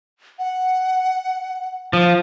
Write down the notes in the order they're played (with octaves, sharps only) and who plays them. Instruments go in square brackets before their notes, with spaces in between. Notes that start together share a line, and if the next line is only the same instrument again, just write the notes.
[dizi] F#5
[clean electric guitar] F3